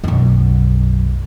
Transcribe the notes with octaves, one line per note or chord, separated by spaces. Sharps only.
B1 F#2